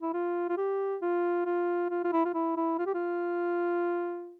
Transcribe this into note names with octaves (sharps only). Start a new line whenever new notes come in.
E4
F4
F4
G4
F4
F4
F4
F4
E4
F4
E4
E4
F4
G4
F4